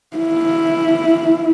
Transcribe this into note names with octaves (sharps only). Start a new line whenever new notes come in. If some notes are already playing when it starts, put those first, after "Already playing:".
E4